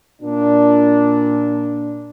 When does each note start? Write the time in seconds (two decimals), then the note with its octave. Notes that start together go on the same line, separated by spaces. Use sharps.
0.22 A#2 D4